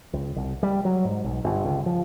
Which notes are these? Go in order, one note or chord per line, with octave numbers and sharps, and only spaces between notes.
C#2
C2
G3
F#3
G#2
B1
G1
C#2
F3